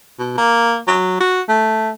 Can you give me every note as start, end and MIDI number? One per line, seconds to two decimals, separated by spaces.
0.19 0.37 47
0.37 0.77 58
0.87 1.19 54
1.20 1.41 66
1.49 1.90 57